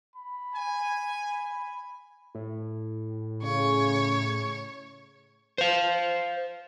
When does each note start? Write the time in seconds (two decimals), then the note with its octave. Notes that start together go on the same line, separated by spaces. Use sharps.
0.16 B5
0.55 G#5
2.35 A2
3.43 C#3 C#5
5.58 C5 F5